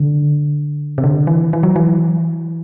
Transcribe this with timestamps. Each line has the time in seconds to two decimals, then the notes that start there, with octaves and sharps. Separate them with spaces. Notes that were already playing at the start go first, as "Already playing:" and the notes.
Already playing: D3
0.98 C3
1.04 D3
1.27 E3
1.53 E3
1.63 F#3
1.76 E3